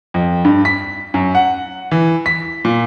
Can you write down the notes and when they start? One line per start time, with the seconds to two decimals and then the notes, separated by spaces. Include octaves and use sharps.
0.14 F2
0.45 G2
0.65 B6
1.14 F#2
1.35 F#5
1.91 E3
2.26 B6
2.65 A#2